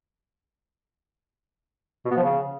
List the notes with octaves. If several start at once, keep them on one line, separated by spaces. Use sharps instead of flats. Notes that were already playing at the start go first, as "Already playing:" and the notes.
B2
B3
F3
C#3